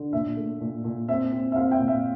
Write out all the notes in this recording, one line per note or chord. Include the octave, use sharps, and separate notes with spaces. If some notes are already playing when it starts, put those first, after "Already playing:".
Already playing: D3
A#2 E5
A3
A#2
A#2
C4 E5
C4
E5
C4 F5
E5 G5
A#2
E5